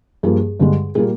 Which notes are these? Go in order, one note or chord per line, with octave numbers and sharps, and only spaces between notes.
G2 F3 A#3 G#4
G2 D3 G#3
A#2 G3 A#3 G#4